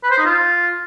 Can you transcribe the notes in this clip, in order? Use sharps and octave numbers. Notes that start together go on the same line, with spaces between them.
B4
C5
D#4
F4